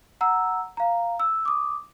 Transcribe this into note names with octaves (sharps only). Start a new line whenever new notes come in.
F#5 A#5 E6
F5 A#5
E6
D6 D#6